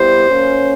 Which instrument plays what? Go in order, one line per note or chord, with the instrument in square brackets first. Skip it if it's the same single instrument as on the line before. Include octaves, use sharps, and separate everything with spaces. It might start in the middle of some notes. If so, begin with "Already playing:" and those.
Already playing: [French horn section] A#2 G3 B3 E4 G4 [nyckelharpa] C5
[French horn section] F#3 A#3 C#4